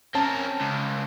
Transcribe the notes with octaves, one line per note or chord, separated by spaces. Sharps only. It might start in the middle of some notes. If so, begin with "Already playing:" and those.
C4 C#4 A#4 A5
C#2